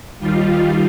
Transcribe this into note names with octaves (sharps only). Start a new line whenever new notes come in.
D#2 D#3 G3 F4